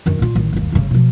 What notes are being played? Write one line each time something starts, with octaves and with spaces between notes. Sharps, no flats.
F#2 D#3
A#2 F4
A1 D#3
G1 D#2
G1 C#3
B2 F3